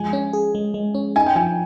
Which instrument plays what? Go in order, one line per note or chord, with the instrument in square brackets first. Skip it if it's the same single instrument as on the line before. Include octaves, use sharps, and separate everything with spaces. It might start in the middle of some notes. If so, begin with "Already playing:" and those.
Already playing: [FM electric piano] F3 G#3 [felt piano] G#5
[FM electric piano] C#4
G#4
G#3
G#3
C#4
[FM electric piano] D#4 [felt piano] G#5
[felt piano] G5
[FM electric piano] F3 [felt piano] G#5